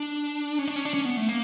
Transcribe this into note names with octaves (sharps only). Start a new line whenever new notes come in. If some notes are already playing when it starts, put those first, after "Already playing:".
Already playing: D4
C#4
D4
C#4
D4
C#4
B3
A3
A#3